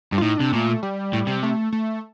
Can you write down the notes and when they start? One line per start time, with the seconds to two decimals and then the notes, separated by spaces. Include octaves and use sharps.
0.12 G2
0.18 F4
0.22 A2 D#4
0.38 C3 D4
0.53 A#2 A3
0.83 G3
1.13 A2
1.27 C3
1.43 A3
1.72 A3